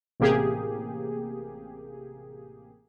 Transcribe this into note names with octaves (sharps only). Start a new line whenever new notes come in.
A1 C3 A#3 G4 G#4